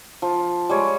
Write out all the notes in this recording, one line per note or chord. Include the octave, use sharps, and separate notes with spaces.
F3
G3 G#3 C#5